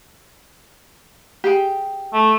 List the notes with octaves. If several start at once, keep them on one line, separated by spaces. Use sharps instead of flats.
G4 G#4 G5
A3